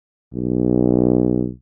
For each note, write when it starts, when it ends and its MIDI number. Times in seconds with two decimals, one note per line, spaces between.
0.34 1.48 35